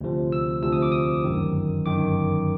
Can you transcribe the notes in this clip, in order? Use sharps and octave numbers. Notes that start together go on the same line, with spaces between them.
D2 C3 F3
E6
D2 C3 F3 E6
D#6
D6
D#6
G1 F#2 D#3
G1 F#2 D#3 D6